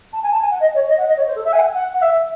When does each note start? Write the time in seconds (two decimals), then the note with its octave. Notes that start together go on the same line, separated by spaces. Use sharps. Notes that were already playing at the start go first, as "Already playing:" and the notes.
0.13 A5
0.22 G#5
0.31 A5
0.41 G#5
0.51 F#5
0.60 D#5
0.74 C#5
0.88 D#5
0.97 F#5
1.07 D#5
1.16 C#5
1.26 C5
1.35 A4
1.45 E5
1.52 G#5
1.59 F#5
1.73 F#5
1.94 F#5
2.01 E5